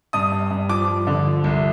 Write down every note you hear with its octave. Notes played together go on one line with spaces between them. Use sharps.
G2 D#6
G2
G2
F3 D6
F3
D3
F3
C2